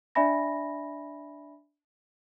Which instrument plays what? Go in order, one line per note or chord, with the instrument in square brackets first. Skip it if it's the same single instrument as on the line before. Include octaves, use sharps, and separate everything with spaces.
[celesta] D4 D5 E5 G#5 B5 A#6